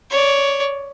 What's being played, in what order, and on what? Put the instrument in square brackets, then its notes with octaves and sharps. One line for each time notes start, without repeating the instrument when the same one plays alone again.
[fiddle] C#5 D5